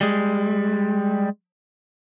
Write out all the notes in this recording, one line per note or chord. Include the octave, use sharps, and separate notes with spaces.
G3 G#3